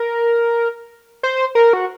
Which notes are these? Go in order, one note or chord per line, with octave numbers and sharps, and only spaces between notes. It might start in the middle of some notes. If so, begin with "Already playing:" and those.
Already playing: A#4
C5
A#4
F#4